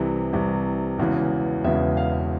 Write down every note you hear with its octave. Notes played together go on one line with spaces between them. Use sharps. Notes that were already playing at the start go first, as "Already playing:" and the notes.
Already playing: C2 C3 E3
C2 C3 E3
E1 E2 C#3 E3
E1 E2 C#3 E3 E5
F5